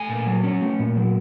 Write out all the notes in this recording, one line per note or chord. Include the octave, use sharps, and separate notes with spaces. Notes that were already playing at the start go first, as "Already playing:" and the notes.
Already playing: A3 G#5
A#2
F#3
C#4
A3
A#2
F#3